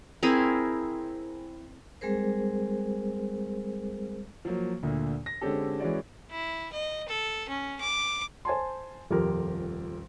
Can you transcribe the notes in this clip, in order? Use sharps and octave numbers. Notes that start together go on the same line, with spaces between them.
C4 E4 G#4 A#4
G3 G#3 C4 G#4 A#4 C5
F3 F#3 A#3
D2 A#2 D3
A#6
D3 G#3 C4 C#4 G4 A4
E3 G#3 C#4 F#4 D5
E4
D#5
A4
C#4
D6
C5 G#5 A5 C6
D#1 F2 F3 G4 A#4